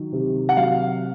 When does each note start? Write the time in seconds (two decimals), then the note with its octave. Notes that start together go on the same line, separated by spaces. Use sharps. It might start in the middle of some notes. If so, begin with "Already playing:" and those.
Already playing: D#3 F#3
0.13 C3
0.49 F#5
0.57 F#3 F5